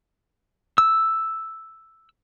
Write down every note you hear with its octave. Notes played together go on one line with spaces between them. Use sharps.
E6